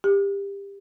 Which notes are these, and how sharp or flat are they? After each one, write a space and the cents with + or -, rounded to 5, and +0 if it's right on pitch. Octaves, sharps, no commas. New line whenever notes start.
G4 +25